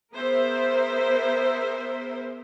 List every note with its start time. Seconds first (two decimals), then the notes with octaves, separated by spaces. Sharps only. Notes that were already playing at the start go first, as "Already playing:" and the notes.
0.15 B3 G#4 A#4 C5 E5